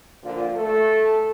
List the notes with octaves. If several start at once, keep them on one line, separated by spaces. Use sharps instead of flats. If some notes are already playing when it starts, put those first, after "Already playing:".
A#2 D3 F3 F4
A3 A4